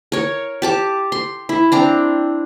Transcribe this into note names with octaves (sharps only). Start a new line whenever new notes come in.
A#4 C#5
G4 A5 D6
C6
E4
C4 D4 A#5